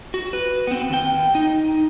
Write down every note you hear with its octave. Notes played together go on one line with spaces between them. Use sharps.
F#4
B4
B3 C4
D#2 G5
D#4